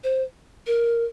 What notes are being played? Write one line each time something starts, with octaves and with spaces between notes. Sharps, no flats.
C5
A#4